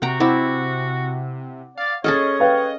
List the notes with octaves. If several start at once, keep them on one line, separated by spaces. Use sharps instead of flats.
C3 F#4 F#5 G5 A#5
C4 E4 F#5 D6
D5 F5
C#4 G#4 A4 C#5 D#5 F6 A6
B4 F5 G5